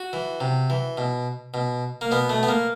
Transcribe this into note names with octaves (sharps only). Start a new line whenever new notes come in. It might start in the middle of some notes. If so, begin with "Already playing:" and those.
Already playing: F#4
E3
C3
E3
B2
B2
A#3
B2 B3
A3
B3
A#3